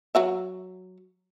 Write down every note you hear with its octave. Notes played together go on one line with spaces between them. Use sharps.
F#3 F#4 E5